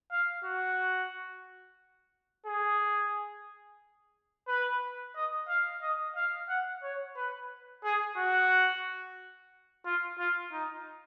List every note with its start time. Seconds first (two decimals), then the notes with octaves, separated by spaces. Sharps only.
0.12 F5
0.44 F#4
2.46 G#4
4.48 B4
5.16 D#5
5.48 F5
5.82 D#5
6.16 F5
6.49 F#5
6.83 C#5
7.17 B4
7.84 G#4
8.17 F#4
9.86 F4
10.19 F4
10.52 D#4